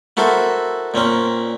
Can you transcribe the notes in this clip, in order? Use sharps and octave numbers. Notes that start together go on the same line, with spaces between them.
E4 F#4 A4 A#4 C5
A#2 C4 C#4 A#4